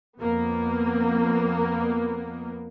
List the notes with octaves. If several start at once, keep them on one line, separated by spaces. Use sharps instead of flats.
F2 A#3 B3